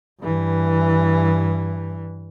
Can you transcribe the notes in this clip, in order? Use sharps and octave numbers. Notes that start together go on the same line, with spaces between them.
G2 E3